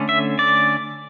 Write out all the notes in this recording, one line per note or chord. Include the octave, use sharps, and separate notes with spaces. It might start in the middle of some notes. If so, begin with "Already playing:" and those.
Already playing: D3 A3 C#4
E5
D5